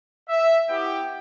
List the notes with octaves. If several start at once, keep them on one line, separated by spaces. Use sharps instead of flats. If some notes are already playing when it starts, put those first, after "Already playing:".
E5
B3 E4 G4 G5